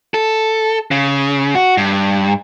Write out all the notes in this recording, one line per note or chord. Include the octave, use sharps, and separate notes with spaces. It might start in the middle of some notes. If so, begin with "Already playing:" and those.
A4
C#3
F#4
G2